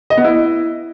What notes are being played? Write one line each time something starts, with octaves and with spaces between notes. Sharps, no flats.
D#5
B3
E4